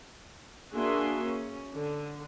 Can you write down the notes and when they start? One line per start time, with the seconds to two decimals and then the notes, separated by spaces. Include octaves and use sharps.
0.74 A#3 D4 F#4 G#4 E5 C6
1.26 C#4
1.73 D3